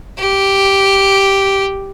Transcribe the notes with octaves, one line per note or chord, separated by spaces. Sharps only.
G4